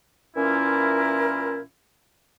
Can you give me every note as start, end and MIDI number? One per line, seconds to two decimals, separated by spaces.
0.36 1.59 46
0.36 1.59 52
0.36 1.59 61
0.36 1.59 64
0.36 1.59 65
0.36 1.59 70